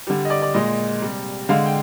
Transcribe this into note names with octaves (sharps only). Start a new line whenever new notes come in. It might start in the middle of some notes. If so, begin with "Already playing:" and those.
D3 G3
D#5
D5
D5
A#2 G#3 D#5
C3 G3
D3 G#3 F5
G5